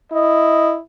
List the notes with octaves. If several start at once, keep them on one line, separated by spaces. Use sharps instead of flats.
E4 D#5